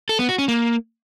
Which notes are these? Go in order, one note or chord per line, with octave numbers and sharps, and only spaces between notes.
A4
B3
F#4
C#4
A#3